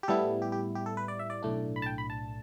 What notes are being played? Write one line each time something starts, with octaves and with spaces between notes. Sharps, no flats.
G4
A2 G3 B3 E4 A4
G4
G4
G4
A4
B4
D5
E5
D5
B1 A2 A3 D4
B5
A5
G5
B5
A5